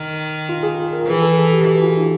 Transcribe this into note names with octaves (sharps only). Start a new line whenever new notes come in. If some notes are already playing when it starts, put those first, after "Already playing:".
Already playing: D#3
F4
G#4
A#4
E3 B4
A4
G#4
G4
E3 F#4
F4
D#4